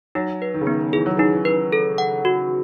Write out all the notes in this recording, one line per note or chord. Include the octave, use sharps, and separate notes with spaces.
F#3 D#4
B4
D#3
C#3
D#3 B3
E3 G#4
F#3
E3 D#4
E3
B4
A4
F#5
F#4